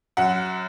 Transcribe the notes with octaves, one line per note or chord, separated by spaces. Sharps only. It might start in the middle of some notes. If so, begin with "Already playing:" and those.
F#2 F#5